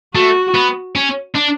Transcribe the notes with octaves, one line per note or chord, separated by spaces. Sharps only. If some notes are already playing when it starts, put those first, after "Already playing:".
A3 F#4
B3
C#4
D4